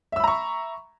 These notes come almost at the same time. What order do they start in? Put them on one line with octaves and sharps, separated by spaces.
E5 E6 B5 A#5 C#6